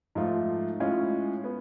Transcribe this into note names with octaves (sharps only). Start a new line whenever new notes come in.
G#2 F3 A3 F4
A2 G#3 C#4 F4
B3